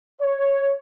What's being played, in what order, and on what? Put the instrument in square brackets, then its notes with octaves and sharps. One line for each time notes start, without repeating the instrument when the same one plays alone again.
[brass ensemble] C#5